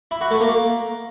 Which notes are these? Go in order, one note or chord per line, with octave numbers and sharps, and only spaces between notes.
E4
F#4
A3
A#3